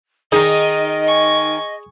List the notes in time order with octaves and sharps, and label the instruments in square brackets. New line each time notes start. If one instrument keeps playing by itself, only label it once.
[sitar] D#3 D#4 [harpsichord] G#4 [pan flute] D#5
[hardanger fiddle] G#5 C#6